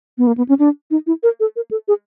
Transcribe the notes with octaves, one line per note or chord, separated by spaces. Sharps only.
B3
A#3
B3
C#4
D4
D#4
E4
A#4
A4
A#4
A4
G#4